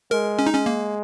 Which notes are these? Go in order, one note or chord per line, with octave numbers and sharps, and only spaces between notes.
G#3 A#4
C#4
D#4
G#3 C#4
A#3